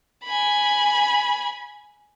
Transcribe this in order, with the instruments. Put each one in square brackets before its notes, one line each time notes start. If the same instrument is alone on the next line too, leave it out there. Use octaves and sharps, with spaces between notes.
[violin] G#5 B5